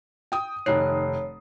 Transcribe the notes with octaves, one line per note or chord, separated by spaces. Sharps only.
G5 D#6
F1 D#3 C#5 C7